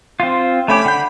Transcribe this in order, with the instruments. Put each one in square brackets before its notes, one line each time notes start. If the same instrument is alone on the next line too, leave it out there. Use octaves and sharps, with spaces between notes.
[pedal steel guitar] C4 F4
[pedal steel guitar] A3 C#4 G4 [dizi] B5
[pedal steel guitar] D3 F#5 G6